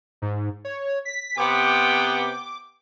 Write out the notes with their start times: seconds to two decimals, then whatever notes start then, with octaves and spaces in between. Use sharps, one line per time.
0.22 G#2
0.65 C#5
1.05 B6
1.38 C3 B3 G5 D6